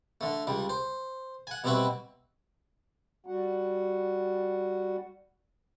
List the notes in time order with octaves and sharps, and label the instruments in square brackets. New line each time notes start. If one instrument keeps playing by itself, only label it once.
[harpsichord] D3 A3
C#2 G3
C5
F#5 G#5
B2 G3 C4 E4 F#4 B4
[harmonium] G3 F#4 F#5